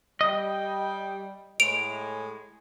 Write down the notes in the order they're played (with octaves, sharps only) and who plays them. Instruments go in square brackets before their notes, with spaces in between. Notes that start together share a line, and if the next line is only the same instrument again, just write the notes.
[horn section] G3 G5 [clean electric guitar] D#5
[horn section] A2 G#3 [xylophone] D7 F7